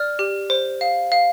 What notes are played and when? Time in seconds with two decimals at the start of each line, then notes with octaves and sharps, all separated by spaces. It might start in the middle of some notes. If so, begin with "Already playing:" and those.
Already playing: D5 F6
0.19 G4
0.50 C5
0.81 F5
1.12 F5